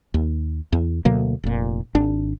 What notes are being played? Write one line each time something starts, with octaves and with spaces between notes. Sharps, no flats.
D#2
E2
D2 B2 F#3 A#3
F1 A#2
G#1 D4